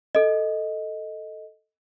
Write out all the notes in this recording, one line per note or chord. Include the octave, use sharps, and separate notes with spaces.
A4 D#5